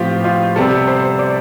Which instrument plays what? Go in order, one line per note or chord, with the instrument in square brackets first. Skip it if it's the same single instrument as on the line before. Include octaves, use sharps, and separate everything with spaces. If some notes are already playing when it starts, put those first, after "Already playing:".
Already playing: [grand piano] A2 F3 C4 [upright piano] B3 F4 G4
[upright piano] F4
[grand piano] C3 G3 B3 [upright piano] A4
[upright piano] C5
D5